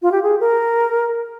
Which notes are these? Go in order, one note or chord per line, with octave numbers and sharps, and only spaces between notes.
F4
G4
G#4
A#4